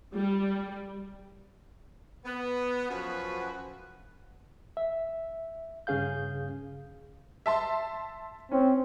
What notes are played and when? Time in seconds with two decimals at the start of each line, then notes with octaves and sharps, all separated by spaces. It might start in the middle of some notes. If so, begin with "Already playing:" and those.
0.13 G3
2.25 B3
2.90 F#2 F3 F#4 B4
4.77 E5
5.87 G2 C#3 C#4 G#4 F5 G6
7.46 E5 A5 C6
8.52 C4 C#4